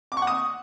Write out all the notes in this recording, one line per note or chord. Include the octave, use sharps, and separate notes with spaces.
D6
C#6
F#5
D#6